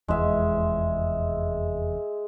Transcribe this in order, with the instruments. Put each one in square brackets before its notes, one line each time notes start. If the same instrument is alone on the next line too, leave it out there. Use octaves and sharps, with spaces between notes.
[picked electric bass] F1 E2 [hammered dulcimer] G#3 E5